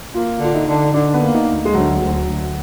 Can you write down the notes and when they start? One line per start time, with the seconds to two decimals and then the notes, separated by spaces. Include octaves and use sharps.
0.14 A#3 F4
0.40 D3 F4
0.54 D#4
0.68 D3
0.93 D3 D4
1.14 B3
1.20 A#3
1.34 D#4
1.46 D2
1.65 G#3
1.73 D2 F#3
2.00 D2
2.26 D2